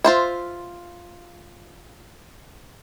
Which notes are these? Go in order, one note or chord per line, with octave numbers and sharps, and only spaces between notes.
F4 C5 E5